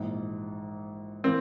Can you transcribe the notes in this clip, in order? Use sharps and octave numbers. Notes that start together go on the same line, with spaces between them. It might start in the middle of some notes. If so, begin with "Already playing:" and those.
Already playing: A#1 G#2 E3
E3 A#3 C4